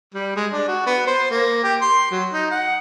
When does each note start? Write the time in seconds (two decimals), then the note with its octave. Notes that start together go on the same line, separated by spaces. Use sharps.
0.14 G3
0.36 G#3
0.53 D4
0.68 F#4
0.87 B3
1.07 C5
1.31 A#3
1.64 G4
1.82 C6
2.11 F#3
2.33 D#4
2.51 F#5